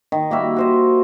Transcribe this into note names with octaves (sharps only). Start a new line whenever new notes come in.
D#3 D#5
G3 A#3 F#4 E5
F#4 C5 D#5